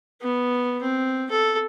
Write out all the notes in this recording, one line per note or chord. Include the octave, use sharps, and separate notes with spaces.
B3
C4
A4